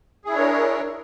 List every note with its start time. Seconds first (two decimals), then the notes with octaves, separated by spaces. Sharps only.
0.25 G#4
0.28 E4
0.32 D4
0.35 C#5
0.39 A#4